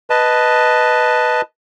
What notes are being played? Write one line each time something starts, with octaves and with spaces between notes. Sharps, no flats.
B4 D#5 A5